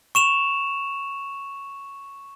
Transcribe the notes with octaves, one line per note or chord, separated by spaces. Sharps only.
C#6 E7 F7